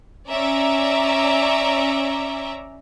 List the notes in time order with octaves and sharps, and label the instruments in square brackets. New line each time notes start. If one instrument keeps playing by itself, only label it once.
[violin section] C#4 D5 E5 A#5